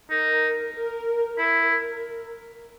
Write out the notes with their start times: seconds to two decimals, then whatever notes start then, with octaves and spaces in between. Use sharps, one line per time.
0.10 D#4 A#4
0.74 A#4
1.38 E4 A#4